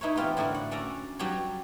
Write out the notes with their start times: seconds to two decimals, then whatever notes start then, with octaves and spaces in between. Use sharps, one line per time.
0.01 D#4 E4 B4 C#5
0.16 E3 B3 C4 F4 G4 B4
0.37 A2 D3 E4 F#4 A#4
0.54 F#5
0.71 C#4 D5 E5 F#5 A#5
1.19 F#3 G3 G4 C#5